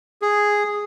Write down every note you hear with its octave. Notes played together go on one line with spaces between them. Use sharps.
G#4